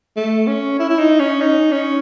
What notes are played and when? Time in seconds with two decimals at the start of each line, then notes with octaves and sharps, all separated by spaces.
0.16 A3
0.47 C#4
0.79 E4
0.90 E4
0.99 D#4
1.20 C#4
1.41 D#4
1.72 C#4